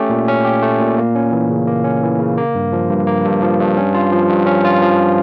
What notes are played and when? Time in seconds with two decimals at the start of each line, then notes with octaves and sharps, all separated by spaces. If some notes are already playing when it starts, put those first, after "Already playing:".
Already playing: A3 C#4 G4
0.10 A#2
0.28 C#4
0.45 G4
0.62 A3
0.80 A#2
0.98 A#3
1.15 C#4
1.32 E3
1.50 C#3
1.67 A#3
1.84 C#4
2.03 E3
2.20 C#3
2.38 A#3
2.55 G2
2.73 F3
2.90 G2
3.07 A#3
3.25 G2
3.42 F3
3.60 G2
3.77 C#4
3.94 F4
4.12 F3
4.30 G2
4.46 C#4
4.64 F4
4.82 F3